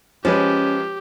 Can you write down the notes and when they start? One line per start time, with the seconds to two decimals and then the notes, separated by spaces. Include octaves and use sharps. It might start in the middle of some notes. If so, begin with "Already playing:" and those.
0.25 F3 G#3 C#4 G4 B4